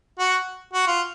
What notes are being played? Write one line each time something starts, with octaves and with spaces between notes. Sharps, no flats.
F#4
F#4
F4